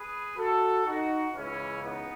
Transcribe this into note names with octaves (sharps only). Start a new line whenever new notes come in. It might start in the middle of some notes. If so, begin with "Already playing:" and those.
Already playing: G#4 B4
F#4 A4
D#4 F#4
C#2 C#3 E3 C#4 E4
B3 D#4